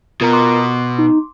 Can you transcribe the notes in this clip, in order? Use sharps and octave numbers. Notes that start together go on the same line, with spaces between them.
B2 F4 A#4 A#5
C6 D6
D#4